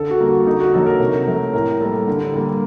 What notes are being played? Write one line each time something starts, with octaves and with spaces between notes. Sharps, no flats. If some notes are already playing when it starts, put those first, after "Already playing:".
Already playing: D3 A4
F#4
G3 A#3
F#4
D3 D#4
F#4
F#3 A#3 A4
A#4
C3
F#3 A3
A2 A#4
G3 A#3 A4
D3
G3 A#3